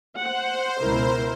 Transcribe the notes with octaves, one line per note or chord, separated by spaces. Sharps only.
C5 F#5
C#2 B2 E4 A#4